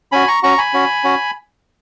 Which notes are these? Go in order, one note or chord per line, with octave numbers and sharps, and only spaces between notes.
C#4 F#4 G#5 B5
A#5 C#6
C#4 F#4 A#5 C#6
G#5 B5
C#4 F#4
C#4 F#4